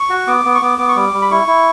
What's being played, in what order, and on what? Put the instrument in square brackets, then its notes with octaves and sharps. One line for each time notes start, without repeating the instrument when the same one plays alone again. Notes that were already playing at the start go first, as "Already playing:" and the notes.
Already playing: [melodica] C#6
F#4
B3 D6
B3
C#6
B3 D6
B3 D6
C#6
G3 D6
G3
B5
E4 C#6
E4